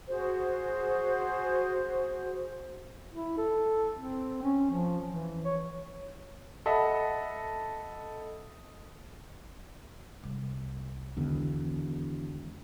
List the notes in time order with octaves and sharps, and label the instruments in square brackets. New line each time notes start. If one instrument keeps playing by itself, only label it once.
[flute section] F#4 G#4 C5
[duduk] E4
A4
C4
C#4
F3
E3
C#5
[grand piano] A4 D#5 E5 F#5 B5
[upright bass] C2
[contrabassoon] E1 [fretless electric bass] E2 [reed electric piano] D3 D#3